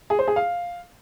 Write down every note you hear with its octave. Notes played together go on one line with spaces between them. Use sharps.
G#4
C5
G#4
F5